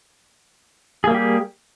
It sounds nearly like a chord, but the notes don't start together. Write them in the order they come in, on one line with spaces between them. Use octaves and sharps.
G#4 A#3 G3 G4